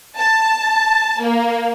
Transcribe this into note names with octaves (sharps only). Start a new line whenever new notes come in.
A5
A#3